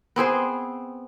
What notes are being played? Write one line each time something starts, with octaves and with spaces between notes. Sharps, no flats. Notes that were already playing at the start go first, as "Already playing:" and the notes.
B3 C4 G#4 C5